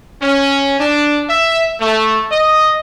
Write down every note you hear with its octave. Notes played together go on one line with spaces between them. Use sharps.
C#4
D4
E5
A3
D#5